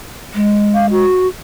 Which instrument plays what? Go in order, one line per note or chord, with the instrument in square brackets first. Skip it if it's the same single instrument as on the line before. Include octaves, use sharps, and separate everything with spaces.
[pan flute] G#3
[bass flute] F5
F#4